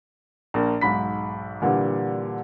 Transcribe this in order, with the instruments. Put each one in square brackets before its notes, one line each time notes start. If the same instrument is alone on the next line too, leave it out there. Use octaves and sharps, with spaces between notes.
[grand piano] A#1 A#3
B1 G#2 B5 B6
A#2 D3 E3 G3